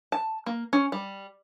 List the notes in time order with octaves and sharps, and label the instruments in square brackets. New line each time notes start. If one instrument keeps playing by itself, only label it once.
[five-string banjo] A5
A#3
C#4
G3